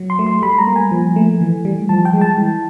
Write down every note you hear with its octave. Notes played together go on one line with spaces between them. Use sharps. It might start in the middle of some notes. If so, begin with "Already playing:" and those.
Already playing: F#3
C6
A3
C6
G3 B5
A#5
A#3
G#5
F3
A3
E3
G3
F3 A5
G5
G#3
A5
E3